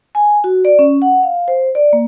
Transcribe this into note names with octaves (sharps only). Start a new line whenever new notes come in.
G#5
F#4
D5
C#4
F#5
F5
C5
D5
A#3